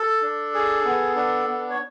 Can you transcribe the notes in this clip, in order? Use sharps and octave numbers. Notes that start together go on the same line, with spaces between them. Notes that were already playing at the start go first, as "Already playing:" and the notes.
Already playing: A4
D4
G#4
B3
D4
B3
C#5